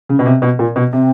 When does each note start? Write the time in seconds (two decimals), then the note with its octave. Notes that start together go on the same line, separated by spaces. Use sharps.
0.09 C#3
0.19 B2
0.26 C3
0.42 B2
0.59 A#2
0.76 B2
0.93 C3 C4